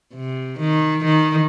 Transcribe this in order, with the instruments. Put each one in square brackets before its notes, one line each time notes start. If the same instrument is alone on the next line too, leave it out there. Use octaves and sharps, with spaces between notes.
[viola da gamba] C3
D#3
D#3